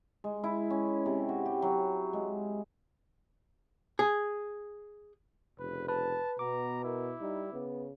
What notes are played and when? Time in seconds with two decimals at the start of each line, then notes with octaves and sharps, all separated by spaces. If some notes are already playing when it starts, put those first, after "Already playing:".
0.24 G#3
0.44 E4
0.70 C#4
1.06 C3
1.29 F#4
1.46 G4
1.62 F#3
2.13 G#3
3.99 G#4
5.59 F1 C#3 B4
5.88 B4 A5
6.39 B2 B3 A#5 D6
6.84 E4 A#4
7.20 G3 D#4
7.53 C#3 B3